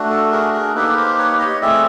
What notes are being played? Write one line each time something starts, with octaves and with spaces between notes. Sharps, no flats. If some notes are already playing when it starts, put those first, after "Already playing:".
Already playing: A3 D4 F#4
A4
G#4 A#4
G#4 A#4
A#3 D#4 G4 A4 B4
A#4 C5
B4 C#5
C#5 D#5
A3 C4 E4 G#4 D5 E5